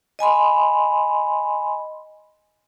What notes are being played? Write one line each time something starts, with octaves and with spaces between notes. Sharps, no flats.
D#5 G#5 B5 C6